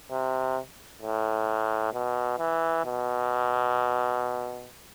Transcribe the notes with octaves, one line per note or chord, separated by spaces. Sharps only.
C3
A2
B2
E3
B2